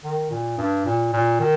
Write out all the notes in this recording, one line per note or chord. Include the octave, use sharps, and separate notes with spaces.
D#3
A#2
G2
A#2
A#2
D#3